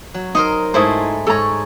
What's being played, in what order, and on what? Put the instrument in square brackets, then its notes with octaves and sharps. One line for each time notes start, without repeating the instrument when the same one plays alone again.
[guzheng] F#3
[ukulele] D#4 [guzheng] A#4 C5 D#5
[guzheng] G#2 G#3 A3 [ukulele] D#4 E4 C5
[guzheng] G#2 C#5 [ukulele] A4 A#5